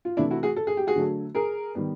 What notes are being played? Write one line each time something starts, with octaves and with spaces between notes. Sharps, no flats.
F4
C3 E3 A3 D4 E4
E4 F#4
F#4 G#4
A4
G#4
G4
F#4 G#4
D3 F#3 A3
G#4 A#4
D#3 G3 B3